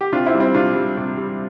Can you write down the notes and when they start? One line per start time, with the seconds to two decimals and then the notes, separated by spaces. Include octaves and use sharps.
0.01 G4
0.12 C3 D4 F4
0.26 C4 E4
0.34 G3
0.40 C4 E4
0.55 C3 D4 F4
0.75 G3
0.97 C3
1.17 G3